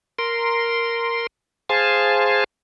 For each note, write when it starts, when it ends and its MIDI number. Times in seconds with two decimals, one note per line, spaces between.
0.19 1.27 70
0.19 1.27 84
1.69 2.44 68
1.69 2.44 72
1.69 2.44 77
1.69 2.44 80
1.69 2.44 81